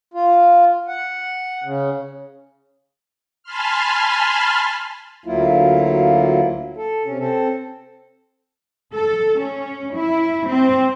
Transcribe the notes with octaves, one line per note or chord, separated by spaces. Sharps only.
F4
F#5
C#3
G#5 A5 B5 C6 F6
D2 F#3 A#3 E4 F4
A4
C3 C#4
C4 A4
A4
C#4
E4
C4